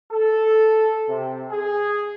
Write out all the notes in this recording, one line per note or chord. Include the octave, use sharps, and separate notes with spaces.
A4
C3
G#4